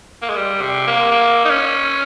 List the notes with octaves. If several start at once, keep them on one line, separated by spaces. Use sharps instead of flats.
A#3
G#3
G3
C3
A#3
A#3
D#4
C#4